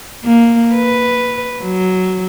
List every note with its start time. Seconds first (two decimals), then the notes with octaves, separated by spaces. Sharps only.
0.25 A#3
0.74 B4
1.62 F#3